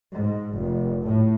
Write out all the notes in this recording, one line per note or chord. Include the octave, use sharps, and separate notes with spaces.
G#2
F1
A2